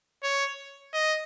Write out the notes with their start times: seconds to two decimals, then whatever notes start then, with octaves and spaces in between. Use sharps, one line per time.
0.23 C#5
0.94 D#5